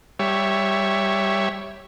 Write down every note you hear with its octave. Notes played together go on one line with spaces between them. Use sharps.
G3 C#5 E5